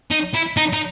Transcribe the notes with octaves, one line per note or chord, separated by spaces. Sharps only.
D#4
E4
D#4
D#4